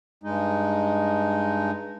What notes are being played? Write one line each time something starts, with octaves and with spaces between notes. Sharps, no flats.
G2 G#3 D#4